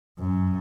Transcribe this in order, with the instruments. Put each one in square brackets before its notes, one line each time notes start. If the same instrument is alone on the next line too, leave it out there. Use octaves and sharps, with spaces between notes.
[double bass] F#2